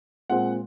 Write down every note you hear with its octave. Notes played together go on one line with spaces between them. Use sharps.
A#2 G#3 C4 F#5